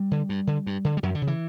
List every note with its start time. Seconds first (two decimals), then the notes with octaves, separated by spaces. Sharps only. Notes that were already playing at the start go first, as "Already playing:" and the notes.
Already playing: G3
0.11 D3
0.29 G2
0.47 D3
0.67 G2
0.85 D3
0.97 G3
1.03 F#2 F#3
1.15 D3
1.22 C#3
1.27 E3